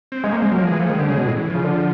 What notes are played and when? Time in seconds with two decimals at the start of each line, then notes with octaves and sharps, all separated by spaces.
0.12 C4
0.24 G#3 C#4
0.33 A#3
0.37 G#3 C4
0.51 F#3 A#3
0.61 F3
0.66 E3 G#3
0.80 F3 A3
0.89 D#3 G#3
0.98 D3 G3
1.08 C#3 G#3
1.17 B2
1.27 A2
1.36 E3
1.50 C#3 F3
1.65 D3